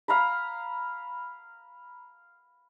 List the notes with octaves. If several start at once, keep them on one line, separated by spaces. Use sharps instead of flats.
F5 A#5 B5